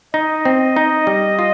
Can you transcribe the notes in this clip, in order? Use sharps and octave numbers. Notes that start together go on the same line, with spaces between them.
D#4 D#5
C4
D#4
G3
F4